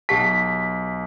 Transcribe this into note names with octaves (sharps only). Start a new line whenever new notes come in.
B1 G4 F#5 A5 B6